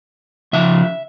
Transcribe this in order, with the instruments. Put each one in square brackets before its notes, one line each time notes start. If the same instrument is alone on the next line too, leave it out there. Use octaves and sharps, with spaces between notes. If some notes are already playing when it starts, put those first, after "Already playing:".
[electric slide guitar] C#3 F3 E5